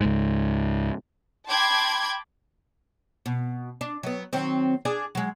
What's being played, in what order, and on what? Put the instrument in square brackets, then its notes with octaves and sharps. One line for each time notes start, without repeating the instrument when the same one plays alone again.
[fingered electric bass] C#2 G#2
[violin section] G5 A5 B5 C6 D6 G#6
[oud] B2
D4
F#3 B3
D#3 F#3 C4
D4 G#4 D5
F#3 G#3